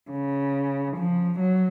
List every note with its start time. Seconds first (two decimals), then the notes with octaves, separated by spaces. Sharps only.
0.10 C#3
0.97 F3
1.39 F#3